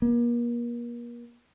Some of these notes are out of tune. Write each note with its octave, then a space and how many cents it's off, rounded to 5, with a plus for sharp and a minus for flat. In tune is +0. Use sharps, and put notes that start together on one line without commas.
A#3 +40